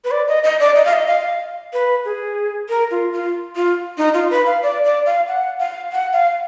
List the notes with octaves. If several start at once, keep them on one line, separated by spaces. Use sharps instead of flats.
B4
D5
D#5
D#5
D5
D#5
F5
D#5
F5
B4
G#4
A#4
F4
F4
F4
D#4
F4
B4
F5
D5
D5
F5
F#5
F5
F#5
F5